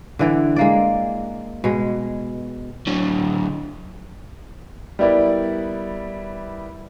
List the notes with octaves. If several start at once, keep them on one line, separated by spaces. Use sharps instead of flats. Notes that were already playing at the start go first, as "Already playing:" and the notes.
D3 E3 D5
G#3 A#3 D5
B2 G#3
D3 F#3
G3 B3 E4 A#4 D5